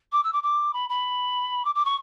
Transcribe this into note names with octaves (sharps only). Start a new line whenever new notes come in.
D6
E6
D6
D6
B5
B5
D6
D6
C#6